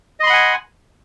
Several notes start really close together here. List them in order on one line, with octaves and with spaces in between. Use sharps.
D#5 C6 B5 F#5 G#5